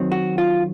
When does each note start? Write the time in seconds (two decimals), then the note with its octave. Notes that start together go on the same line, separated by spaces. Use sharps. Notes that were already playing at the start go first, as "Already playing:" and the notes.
Already playing: F#2 D#3 F#3 C4
0.12 F#4
0.38 F4